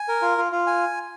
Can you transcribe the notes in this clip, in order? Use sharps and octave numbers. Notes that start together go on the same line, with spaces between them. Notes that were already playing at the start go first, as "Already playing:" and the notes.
Already playing: G#5
A#4
F4
F4
F4
G#5